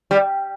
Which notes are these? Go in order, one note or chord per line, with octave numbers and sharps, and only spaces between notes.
G3